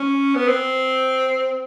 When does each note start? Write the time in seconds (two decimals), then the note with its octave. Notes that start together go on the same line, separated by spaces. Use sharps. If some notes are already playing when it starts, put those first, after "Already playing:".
Already playing: C#4
0.35 B3
0.47 C4